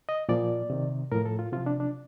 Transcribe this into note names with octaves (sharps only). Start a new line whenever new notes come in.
D#5
A#2 F3 D5
C3 D#3
A2 F3 A#4
A4
F4
C3 F3 F4
D4
D4